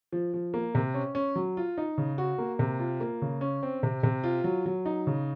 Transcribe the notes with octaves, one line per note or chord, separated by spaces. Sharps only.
F3
F3
A#3
C3
C#4
C#4
F#3
F4
D#4
C#3
F#4
A#3
C3
F4
A#3
C#3
C#4
C4
C3
C3
F4
F#3
F#3
D#4
C#3